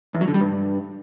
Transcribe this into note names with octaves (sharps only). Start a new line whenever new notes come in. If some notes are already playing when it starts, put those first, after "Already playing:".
E2
F#3
D3
G3
G2